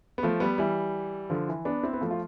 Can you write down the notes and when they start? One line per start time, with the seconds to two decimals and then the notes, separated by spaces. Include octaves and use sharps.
0.18 B3
0.23 F3 A3
0.40 G3 B3
0.58 E3 G3
1.30 D3 F3
1.48 E3
1.65 B3 D4
1.83 C4 E4
1.93 B3
2.01 F3 A3
2.11 F4